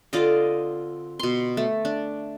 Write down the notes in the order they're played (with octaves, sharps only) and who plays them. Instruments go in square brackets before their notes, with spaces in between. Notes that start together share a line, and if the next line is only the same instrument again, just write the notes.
[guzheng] D3 C4 [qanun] F4 D5 D#5
[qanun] B2 C6
A3
D4